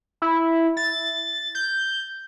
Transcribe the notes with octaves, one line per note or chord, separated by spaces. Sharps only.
E4
A6
G6